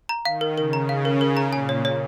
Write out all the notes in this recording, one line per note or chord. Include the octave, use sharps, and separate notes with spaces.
A#5
D#3 F5
A#4
C#3 A#4
A#5
F5
A#4
A#4
A#5
A#2 G#5
C#5
C#5